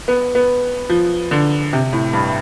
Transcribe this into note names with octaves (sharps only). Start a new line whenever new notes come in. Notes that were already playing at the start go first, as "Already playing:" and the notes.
B3
B3
F3
D3
C3
A2
G2